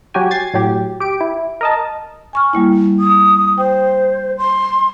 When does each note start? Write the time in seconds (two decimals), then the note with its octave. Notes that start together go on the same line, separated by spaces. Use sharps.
0.14 F#3 F#4 G4 G#5
0.31 G#6 A6 C7
0.54 A2 F#3 G4
1.00 G4 D7
1.21 E4
1.61 A#4 D#5 A5
2.33 G#5 C#6 F6
2.53 G3 A#3 E4
3.00 D#6
3.58 C5 G5
4.38 C6